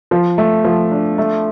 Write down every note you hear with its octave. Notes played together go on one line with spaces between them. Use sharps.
F3
A3
F3
D4
A3